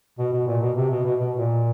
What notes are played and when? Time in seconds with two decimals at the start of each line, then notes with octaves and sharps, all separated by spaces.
0.18 B2
0.32 B2
0.47 A#2
0.61 B2
0.77 C3
0.90 B2
1.05 B2
1.20 B2
1.35 A#2